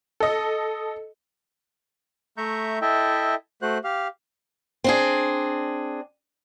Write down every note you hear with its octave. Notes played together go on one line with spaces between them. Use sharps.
A4 D#5
A3 E5 A#5 C#6 G6
E4 A4 D#5 E5 G5
A3 F#4 C5 F#6
G4 F5
C4 D4 G#4